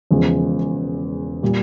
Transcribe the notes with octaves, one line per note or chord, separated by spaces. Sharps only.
E1 E2 C#3 F3 G#3
A#2 G3